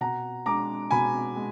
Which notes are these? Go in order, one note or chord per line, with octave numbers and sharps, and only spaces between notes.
B2 F#5 A#5
G#3 D4 A#5 D6
B2 G#5 B5
G#3